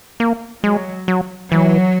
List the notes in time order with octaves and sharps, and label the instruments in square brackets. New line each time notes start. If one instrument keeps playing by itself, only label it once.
[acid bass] A#3
[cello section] F#3 [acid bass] G#3
[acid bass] F#3
[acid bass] E3 [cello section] F#3